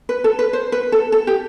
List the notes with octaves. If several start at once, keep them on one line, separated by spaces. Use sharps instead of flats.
B4
A4
B4
C5
B4
A4
A4
G4